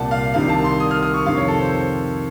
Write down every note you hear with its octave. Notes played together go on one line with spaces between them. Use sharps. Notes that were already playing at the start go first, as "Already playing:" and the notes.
Already playing: C2 A#2 F#5 A5
F5
C2 C3 D#3 F5
A5
C6
D#6
F6
D#6
C#6
F2 C3 D#3 F5
C#5
A4
C5
C5